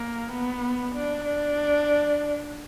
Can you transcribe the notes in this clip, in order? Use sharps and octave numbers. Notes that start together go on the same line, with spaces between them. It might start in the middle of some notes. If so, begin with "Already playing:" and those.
Already playing: A#3
B3
D4
D4